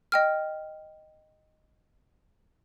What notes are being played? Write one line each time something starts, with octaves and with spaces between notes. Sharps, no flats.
D#5 G5 F6